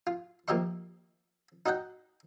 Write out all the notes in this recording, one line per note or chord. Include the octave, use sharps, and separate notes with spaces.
F4
F3 A#3 G4 D#5 E5 C#6
D#4 F#4 D#5 F#5 G5